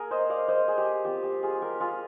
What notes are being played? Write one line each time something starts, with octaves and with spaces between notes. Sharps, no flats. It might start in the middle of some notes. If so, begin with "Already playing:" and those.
Already playing: A#3 G#4 A#4
C5 D#5
D5 F5
C5 D#5
G#4
G4
G3 C4 F4 G4
G4
F4 G#4
G4 A#4
F4 G#4